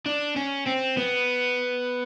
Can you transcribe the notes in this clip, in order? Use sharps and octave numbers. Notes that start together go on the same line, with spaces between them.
D4
C#4
C4
B3